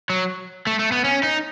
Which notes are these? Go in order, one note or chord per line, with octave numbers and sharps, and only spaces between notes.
F#3
A3
A3
B3
C#4
D#4